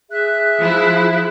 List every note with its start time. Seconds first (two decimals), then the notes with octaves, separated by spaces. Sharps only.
0.10 G#4 E5 F#6
0.61 F3 E4